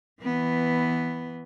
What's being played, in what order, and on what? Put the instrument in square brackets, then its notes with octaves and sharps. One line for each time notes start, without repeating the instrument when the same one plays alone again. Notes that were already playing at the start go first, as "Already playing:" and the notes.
[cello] E3 B3